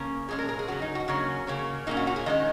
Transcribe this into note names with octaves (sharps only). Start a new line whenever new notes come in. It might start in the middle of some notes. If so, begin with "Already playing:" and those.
Already playing: C#3 A#3 C#4
A#2 G#3 C#4 G#4
A#4
A#4
G#4
C#3 F#3 C#4 F#4
D#4
F#4
C#3 F#3 A#3 C#4
C#3 A#3 C#4
A#2 A#3 C#4 D#4
F#4
F#4
G#4
D#3 G#3 C#4 D#5